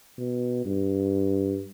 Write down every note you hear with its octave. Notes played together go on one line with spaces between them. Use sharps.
B2
G2